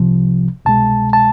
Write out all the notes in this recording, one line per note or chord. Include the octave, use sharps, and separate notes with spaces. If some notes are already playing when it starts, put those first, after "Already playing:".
Already playing: C2 C3 F3
C2 B2 G#3 A5
A5